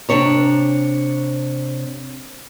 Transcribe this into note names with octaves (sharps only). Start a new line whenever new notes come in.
C3 D4 C#5 A#5